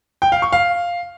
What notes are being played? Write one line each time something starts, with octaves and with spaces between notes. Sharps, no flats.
G5
F5
C#6
F5